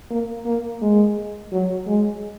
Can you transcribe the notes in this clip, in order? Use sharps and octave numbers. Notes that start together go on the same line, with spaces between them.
A#3
A#3
G#3
F#3
G#3